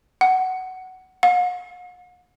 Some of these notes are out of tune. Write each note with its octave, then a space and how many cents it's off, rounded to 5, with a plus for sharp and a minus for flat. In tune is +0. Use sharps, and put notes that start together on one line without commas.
F#5 +15
F#5 -45